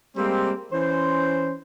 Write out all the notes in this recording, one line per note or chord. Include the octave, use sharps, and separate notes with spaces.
G3 G#3 A#3 C4
E3 C#4 C5